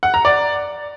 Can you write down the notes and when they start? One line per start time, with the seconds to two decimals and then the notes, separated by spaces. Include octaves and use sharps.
0.03 F#5
0.14 A#5
0.25 D5